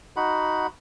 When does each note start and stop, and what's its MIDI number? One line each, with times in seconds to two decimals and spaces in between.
0.17 0.67 63
0.17 0.67 66
0.17 0.67 78
0.17 0.67 83